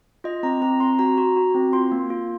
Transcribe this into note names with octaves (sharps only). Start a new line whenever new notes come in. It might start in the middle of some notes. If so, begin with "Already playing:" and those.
F4 D#5
C4 A#5
C4 A#5
C4 C6
F#4 A#5
F#4
F#4
C4
F4 C6
A#3
F4